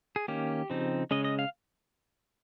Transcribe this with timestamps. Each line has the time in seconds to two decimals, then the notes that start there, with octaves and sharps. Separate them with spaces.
0.16 G#4
0.28 D#3 A#3 C#4 G4
0.70 C#3 F3 C4 D#4
1.11 C#3 G#3 C#4 D#5
1.24 D#5
1.39 F5